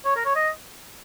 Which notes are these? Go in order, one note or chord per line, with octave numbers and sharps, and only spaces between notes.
C#5
A#4
C#5
D#5